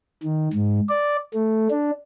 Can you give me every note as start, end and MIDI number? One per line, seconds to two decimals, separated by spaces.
0.23 0.49 51
0.53 0.80 44
0.89 1.17 74
1.34 1.68 57
1.71 1.91 62